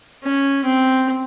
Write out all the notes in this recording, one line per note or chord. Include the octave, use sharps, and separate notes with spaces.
C#4
C4